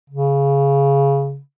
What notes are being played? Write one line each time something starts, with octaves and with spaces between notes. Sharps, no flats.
C#3